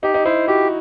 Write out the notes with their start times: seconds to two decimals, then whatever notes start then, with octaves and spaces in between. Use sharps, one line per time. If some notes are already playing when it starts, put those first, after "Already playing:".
0.03 D#4 G4
0.14 D#4
0.25 E4 C5
0.48 F#4 G4